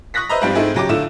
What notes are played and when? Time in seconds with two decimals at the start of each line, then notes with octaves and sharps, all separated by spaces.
0.14 C#6 D#6 F#6 A#6 B6
0.29 B4 C5 D#5 E5 A#5
0.41 G#2 F3 G3 C4 F4 G4
0.55 G#2 A3 C4 D#4 E4 G#4
0.75 C#3 F#3 G4 D6
0.89 A2 D3 F4 E5 E6 E7